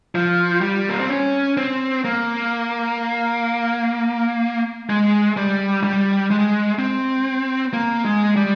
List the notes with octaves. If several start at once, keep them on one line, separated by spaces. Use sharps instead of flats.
F3
G3
A#3
C4
C#4
C4
A#3
G#3
G3
G3
G#3
C4
A#3
G#3
G3